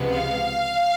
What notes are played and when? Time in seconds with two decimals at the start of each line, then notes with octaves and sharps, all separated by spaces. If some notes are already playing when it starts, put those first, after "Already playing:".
Already playing: C#2 C3 F3 G#3 B3
0.10 F5